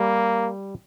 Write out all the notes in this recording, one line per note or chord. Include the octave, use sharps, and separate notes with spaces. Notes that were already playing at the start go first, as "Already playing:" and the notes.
Already playing: G3 A#3